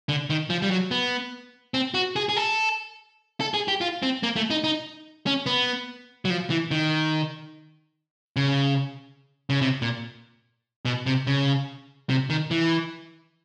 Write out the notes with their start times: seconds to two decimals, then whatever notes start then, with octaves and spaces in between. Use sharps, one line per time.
0.09 D3
0.30 D#3
0.50 F3
0.62 G3
0.70 F#3
0.91 B3
1.74 C4
1.94 F#4
2.16 G#4
2.29 G#4
2.37 A4
3.40 A4
3.54 G#4
3.68 G4
3.81 F4
4.03 C4
4.23 A#3
4.36 A3
4.50 D#4
4.64 D#4
5.26 C#4
5.46 B3
6.25 F#3
6.30 F3
6.50 E3
6.71 D#3
8.36 C#3
9.50 C#3
9.62 C3
9.82 A#2
10.85 B2
11.06 C3
11.27 C#3
12.10 C3
12.30 D#3
12.51 E3